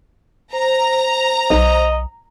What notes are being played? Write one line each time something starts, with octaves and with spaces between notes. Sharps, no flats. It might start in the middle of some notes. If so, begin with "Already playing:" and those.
C5 A#5
B1 D#5